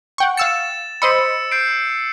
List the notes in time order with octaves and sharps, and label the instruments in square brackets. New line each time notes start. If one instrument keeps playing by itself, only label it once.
[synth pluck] F#5 G5 C#6
[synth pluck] F5 E6 C#7 [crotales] A6 E7
[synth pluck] C5 D#5 B5 [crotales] E6 C#7
[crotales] G6 C7 D7